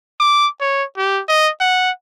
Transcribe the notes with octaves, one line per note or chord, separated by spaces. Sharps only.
D6
C#5
G4
D#5
F#5